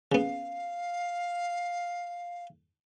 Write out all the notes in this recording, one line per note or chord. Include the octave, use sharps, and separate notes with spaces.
C#3 B3 F5